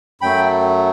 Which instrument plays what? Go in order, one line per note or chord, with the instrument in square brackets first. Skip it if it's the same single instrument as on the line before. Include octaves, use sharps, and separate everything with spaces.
[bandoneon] F#2 F#3 A3 G5 B5